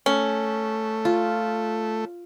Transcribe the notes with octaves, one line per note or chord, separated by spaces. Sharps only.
A3 C#4
F4